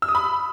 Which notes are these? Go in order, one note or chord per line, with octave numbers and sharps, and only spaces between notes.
E6
D#6
B5